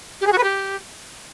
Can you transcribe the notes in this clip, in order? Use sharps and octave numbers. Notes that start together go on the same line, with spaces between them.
G4
G#4
F#4
B4
G4